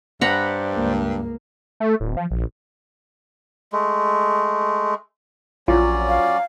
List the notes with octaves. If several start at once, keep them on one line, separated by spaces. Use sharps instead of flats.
G2 C5 D5 F#5 A#5 B5
C#2 A#3
A3
D1
F3
A#1
G#3 A3
A#1 F#3 C#4 F4 D5
F5